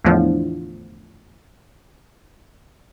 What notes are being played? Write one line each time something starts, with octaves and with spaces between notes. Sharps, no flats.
E2 A2 D3 F3